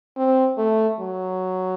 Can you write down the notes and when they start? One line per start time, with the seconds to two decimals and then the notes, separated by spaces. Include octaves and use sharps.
0.17 C4
0.58 A3
1.00 F#3